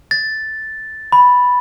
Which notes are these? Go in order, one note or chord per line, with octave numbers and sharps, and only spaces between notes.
A6
B5